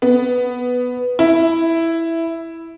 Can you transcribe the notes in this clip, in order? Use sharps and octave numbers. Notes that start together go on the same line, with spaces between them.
B3
E4